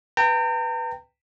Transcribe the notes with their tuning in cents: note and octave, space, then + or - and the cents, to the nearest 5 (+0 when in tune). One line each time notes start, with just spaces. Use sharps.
B4 +0 G5 +0 A#5 -40